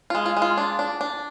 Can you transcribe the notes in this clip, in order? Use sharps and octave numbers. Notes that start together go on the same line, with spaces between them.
F4
G#3
F4
G#3
F4
D4
D4
D4